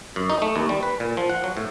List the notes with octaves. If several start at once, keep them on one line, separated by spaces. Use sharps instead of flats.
F#2
D#4
A3
D#2
G3
B4
A#2
F3
F#5
F#3
A2